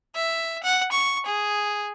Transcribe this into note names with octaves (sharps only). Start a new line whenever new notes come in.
E5
F#5
C#6
G#4